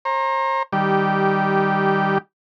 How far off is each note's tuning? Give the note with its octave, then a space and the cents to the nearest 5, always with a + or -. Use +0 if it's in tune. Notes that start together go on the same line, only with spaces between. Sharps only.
C5 +40 A#5 +0
D#3 +0 G3 +0 G4 -15